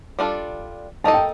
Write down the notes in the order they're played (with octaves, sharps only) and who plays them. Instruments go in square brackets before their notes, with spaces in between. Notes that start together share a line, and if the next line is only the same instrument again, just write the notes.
[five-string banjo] G3 D4 F4 A4
[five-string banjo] A#3 D#4 A4 D#5 [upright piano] A5
[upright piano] G5